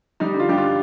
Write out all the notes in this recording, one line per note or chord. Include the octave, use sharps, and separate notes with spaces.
G3 D#4
D3
F4
G2 G4
F4